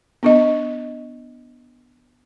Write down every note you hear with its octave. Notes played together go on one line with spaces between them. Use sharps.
B3 D4 D#5